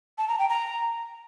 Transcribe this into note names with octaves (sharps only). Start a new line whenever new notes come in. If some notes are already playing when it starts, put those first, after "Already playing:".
A5
A#5
G5
A#5